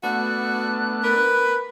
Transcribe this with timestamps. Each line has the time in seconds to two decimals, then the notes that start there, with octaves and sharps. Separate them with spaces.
0.03 A3 B3 D4 F#4 F#6
1.03 A#4 B4